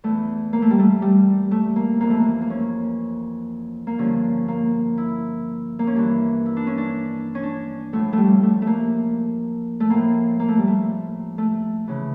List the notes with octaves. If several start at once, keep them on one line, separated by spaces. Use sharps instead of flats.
E2 E3 A3
A#3
A3
G3
A3
G3
A3
A#3
F2 E3 A#3
A3
A#3
A#3
C#4
A#3
G2 D3 F3 C#4
A#3
E4
A#3
C#4
G2 E3 D4
E4
D4
C#4
D4
C#4
D4
A2 F3 A3
A3
G3
A3
A3
A#3
A3
A2 F3 A#3
A#3
A3
G3
A3
A3
C#3 E3